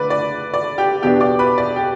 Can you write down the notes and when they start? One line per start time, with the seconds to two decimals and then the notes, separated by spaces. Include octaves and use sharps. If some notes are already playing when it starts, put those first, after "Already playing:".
Already playing: D3 A3 B4 D5
0.10 D5
0.54 D5
0.78 G4 G5
1.02 E2 B2 B3 D4 G4 G5
1.21 D5 D6
1.39 B4 B5
1.58 D5
1.76 G4 G5